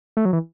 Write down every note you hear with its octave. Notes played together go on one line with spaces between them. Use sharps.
A3
F#3
E3